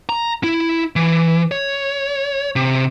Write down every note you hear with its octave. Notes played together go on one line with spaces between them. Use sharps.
A#5
E4
E3
C#5
C3